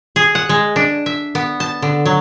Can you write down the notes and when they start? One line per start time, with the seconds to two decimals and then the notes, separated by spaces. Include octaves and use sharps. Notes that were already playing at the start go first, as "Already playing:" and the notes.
0.16 G#4
0.35 F#5
0.49 G#3
0.76 D4
1.06 E5
1.35 B3
1.60 A5
1.82 D3
2.06 F#3